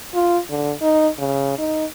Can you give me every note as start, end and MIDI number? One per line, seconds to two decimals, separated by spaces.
0.14 0.38 65
0.49 0.72 50
0.81 1.08 63
1.19 1.56 49
1.58 1.85 63